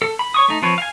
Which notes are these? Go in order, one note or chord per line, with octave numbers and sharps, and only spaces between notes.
A4
B5
C#5 C#6 D#6
A3 D#4
F3 C4 B4 C#5
F5 G#5